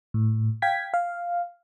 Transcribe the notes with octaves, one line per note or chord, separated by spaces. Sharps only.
A2
F5 G5 G#6 B6
F5